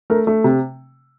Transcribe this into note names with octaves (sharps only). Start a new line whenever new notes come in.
A3 A#4
A3
C3